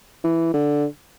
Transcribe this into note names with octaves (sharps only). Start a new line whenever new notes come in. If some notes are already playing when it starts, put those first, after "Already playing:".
E3
D3